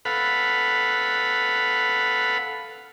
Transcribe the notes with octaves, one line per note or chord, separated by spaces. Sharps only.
A4 B4 F5 F#5 B5